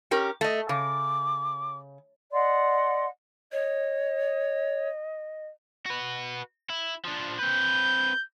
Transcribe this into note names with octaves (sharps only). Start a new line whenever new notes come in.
C#4 G4 A#4
A3 D#5
C#3 D6
D5 D#5 F#5 C6
C#5 D#5
F#4 B4
E4
F3 D4
C4 B4 G6